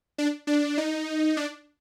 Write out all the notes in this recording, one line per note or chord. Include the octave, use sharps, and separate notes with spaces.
D4
D4
D#4
D4